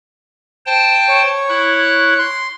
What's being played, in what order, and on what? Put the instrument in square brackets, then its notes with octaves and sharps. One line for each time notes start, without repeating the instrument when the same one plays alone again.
[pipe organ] C5 G5 A5
[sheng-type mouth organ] C#5
[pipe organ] E4 F#6
[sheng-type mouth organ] C6